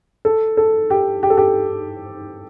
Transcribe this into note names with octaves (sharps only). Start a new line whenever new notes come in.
A4
A4
G4
G4
A4
G4